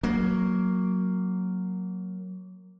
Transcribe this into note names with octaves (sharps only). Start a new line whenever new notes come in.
F#3 A#3